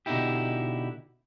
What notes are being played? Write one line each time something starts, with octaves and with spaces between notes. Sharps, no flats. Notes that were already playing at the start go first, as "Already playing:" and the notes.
B2 D3 D#4 E4 G4